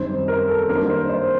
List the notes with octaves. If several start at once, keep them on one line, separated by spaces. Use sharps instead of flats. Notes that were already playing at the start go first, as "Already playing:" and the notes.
Already playing: F#2 D#3 G3 C4 C5
A#4
A4
G2 D#3 F#3 A#3 D4 A#4
C5
C5